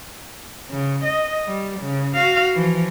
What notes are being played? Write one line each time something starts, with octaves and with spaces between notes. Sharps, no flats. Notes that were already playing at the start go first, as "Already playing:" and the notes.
C#3
D#5
G3
C#3
F#4 F5
E3 F3